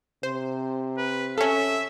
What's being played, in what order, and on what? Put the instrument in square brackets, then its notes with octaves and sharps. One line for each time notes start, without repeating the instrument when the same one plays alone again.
[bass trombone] C3 [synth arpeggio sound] C5
[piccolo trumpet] B4
[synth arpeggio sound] C#4 A4 [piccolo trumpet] E5